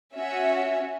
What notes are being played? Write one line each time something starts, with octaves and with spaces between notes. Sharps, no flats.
C#4 F#4 E5